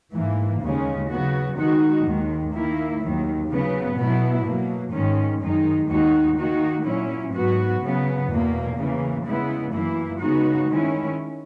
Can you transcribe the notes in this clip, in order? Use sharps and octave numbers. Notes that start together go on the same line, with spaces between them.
G#2 E3 A#3
D#2 C#3 G#3 C#4
C#3 F#3 B3 F#4
D#3 G#3 D#4 F#4
D#2 D#3 G#3
D#3 A#3 E4
D#2 D#3 F#3
C#3 F#3 B3
B2 F#3 B3 E4
B2 F#3 A#3
G#2 D#3 G#3 C#4
F#2 D#3 G#3 D#4
D#2 D#3 G#3 D#4 F#4
D#3 A#3 D#4 F#4
A#2 F#3 C#4 E4
G#2 F#3 B3 F#4
C#3 F#3 B3
E2 B2 A#3
C#3 E3 A#3
C#3 G#3 B3 E4
F#2 E3 A#3 E4
C#3 G#3 B3 D#4 F#4
D#3 G#3 C#4 E4